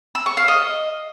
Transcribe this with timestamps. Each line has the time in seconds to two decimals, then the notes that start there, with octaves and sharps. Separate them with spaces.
0.15 E6
0.26 C#6
0.37 F5
0.48 D#5